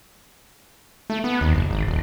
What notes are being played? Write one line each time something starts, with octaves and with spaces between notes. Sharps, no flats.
A3
B3
D#2
F#1
G#1
D#1